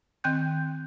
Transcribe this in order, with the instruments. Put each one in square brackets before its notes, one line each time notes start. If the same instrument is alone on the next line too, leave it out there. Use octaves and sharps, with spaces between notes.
[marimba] D#3 C4 G5 F#6 G6